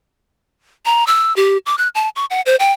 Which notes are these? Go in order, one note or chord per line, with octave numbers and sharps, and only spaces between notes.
A#5
E6
G4
D6
F#6
A5
C#6
F#5
C5
G5